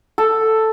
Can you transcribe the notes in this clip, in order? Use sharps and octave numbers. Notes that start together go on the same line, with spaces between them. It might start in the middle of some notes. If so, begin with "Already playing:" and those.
A4